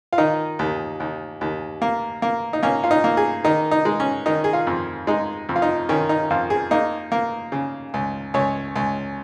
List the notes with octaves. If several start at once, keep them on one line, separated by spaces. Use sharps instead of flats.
F4
D#3 D#4
D#2
D#2
D#2
A#3
A#3
D#4
A#3 C#4
F4
D#4
A#3
G#4
D#3 D#4
D#4
G#3
C#4
D#3 D#4
G#4
F4
F2
G#3 D#4
F2
F4
D#4
D#3 C#4
D#4
F2 F4
G#4
A#3 D#4
A#3
C#3
C#2
C#2 C#5
C#2